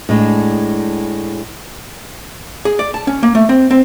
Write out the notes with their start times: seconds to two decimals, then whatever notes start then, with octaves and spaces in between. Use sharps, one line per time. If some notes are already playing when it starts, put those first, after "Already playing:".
0.09 A2 G#3 D4
2.65 G#4
2.79 D5
2.94 A5
3.07 C#4
3.23 A#3
3.35 A3
3.49 C4
3.71 C4